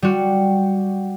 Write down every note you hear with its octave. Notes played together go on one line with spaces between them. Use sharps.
G3 F#4